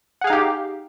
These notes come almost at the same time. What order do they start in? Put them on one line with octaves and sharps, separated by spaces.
F#5 G#4 F5 D#4 G4